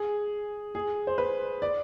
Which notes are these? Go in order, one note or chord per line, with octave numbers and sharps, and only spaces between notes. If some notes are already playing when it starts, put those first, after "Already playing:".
Already playing: G#4
G#4
C5
B4
D5